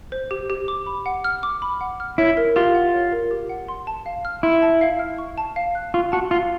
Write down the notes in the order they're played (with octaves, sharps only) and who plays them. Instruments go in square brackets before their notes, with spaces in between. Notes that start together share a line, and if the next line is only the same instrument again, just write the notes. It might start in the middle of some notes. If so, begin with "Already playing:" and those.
[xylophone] C5
G4
G4
D6
B5
F#5
F6
D6
B5
F#5
F6
[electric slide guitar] E4 [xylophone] C#5
[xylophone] A#4
[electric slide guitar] F4 [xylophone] G4
[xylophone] F#5
C#5
A#4
G4
F#5
C6
A5
F5
F6
[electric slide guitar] E4 [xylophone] C6
[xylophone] A5
F5
F6
C#6
A5
F5
F#6
[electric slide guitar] F4 [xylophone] C#6
[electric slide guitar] F#4 [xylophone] A5
[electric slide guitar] F4 [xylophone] F5